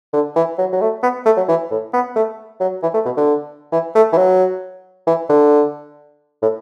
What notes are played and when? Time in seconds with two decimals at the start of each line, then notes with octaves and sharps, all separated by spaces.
0.13 D3
0.36 E3
0.58 F#3
0.72 F#3
0.81 A3
1.03 B3
1.26 A3
1.37 F#3
1.48 E3
1.71 A2
1.93 B3
2.16 A3
2.60 F#3
2.83 E3
2.94 A3
3.05 B2
3.17 D3
3.72 E3
3.95 A3
4.13 E3
4.18 F#3
5.07 E3
5.29 D3
6.42 A2